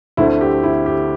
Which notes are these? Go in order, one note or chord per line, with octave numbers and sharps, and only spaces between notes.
D2 D3 A3 C4 E4
G4
E4
G4